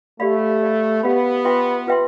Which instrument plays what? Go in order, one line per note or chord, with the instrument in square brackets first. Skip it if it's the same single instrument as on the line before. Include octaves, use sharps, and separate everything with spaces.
[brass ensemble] A3 [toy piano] G4 D5 F5 B5
[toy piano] G4 D5 F5 B5
[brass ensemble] B3 [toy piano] G4 D5 F5 B5
[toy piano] F4 B4 E5 G5 C6
F4 B4 E5 G5 C6